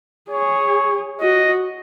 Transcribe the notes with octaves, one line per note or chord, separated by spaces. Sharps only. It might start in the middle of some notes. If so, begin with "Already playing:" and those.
G#4 C#5
F#4 D#5